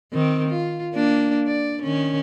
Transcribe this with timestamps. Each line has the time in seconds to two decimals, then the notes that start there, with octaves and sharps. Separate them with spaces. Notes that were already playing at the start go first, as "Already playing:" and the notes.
0.13 D#3 C4
0.50 F4
0.93 A#3 D4
1.47 D5
1.83 D#3 C#4